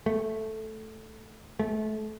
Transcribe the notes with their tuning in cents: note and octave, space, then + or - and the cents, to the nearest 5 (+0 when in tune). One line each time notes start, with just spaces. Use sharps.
A3 -5
A3 -30